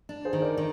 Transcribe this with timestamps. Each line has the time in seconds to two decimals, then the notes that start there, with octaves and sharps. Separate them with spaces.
0.09 D4
0.25 G#4 C5
0.33 D#3
0.42 A#4 D5
0.57 D#3